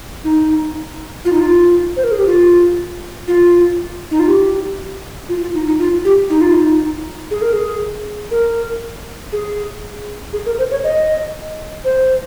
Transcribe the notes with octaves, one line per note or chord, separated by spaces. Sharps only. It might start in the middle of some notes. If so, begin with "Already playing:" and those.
D#4
F4
D#4
F4
C5
A#4
G#4
G4
F4
F4
D#4
F4
G4
F4
F4
D#4
D#4
F4
G4
D#4
F4
D#4
G#4
A#4
G#4
A#4
G#4
G#4
A#4
C5
C#5
D#5
C5